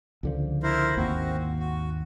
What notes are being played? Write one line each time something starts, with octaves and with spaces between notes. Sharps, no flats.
C#2 D3 F3
E4 A#4 C5
G#1 D#2 A#3 C4 F#4
F#4